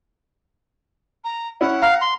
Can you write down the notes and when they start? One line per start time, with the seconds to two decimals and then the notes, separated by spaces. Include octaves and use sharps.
1.24 A#5
1.61 C#4 E4 F#5
1.82 F5 A#5
2.01 C6